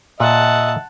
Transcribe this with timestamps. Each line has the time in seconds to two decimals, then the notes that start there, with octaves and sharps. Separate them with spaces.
0.20 A#2 D#5 E5 F#5 A5